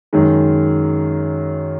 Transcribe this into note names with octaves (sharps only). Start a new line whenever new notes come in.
F#2 D#3 G#3